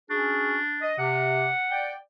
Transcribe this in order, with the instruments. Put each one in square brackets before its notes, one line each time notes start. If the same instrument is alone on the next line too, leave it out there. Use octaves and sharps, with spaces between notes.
[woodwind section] C#4 F#4 G#4 [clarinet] D4
[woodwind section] D#5
[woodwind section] C3 [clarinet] F#5
[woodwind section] D5 G5